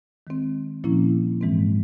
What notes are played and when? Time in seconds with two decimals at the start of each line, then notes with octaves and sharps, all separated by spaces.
0.27 D#3 G#3 C4
0.84 A#2 F3 A#3 C#4 E4
1.41 G#2 E3 G#3 C4